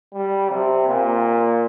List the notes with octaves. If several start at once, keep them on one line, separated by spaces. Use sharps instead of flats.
G3
C3
A#2